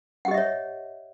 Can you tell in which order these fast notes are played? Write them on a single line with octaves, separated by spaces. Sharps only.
F#5 G4 D#5 E5 C#5